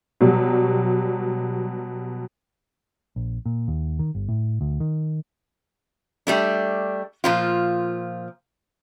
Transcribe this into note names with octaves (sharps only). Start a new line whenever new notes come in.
B2 F#3 G3
A#1
A#2
D#2
D#3
G1
A2
D2
D#3
G3 A3 D4
A#2 F3 F4